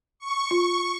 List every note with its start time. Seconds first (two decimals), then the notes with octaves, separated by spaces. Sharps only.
0.19 C#6
0.51 F4